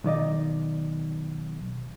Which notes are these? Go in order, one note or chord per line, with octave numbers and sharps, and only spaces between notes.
B1 D#3 D5 D#5